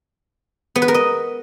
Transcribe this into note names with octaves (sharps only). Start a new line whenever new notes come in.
B3
B4
A#4
D#5